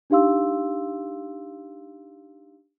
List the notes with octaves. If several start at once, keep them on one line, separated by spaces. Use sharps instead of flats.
D4 D#4 G4 F5 C6 E6